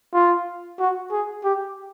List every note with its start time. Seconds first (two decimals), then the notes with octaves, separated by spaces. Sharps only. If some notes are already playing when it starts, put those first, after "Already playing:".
0.14 F4
0.79 F#4
1.11 G#4
1.44 G4